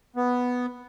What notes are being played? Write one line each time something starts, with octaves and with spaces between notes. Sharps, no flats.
B3